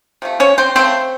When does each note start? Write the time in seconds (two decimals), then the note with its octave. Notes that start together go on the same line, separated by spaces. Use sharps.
0.22 C3 F3 A3
0.40 C#4 C#5
0.58 C4 C5
0.75 C#3 A3 C4 C5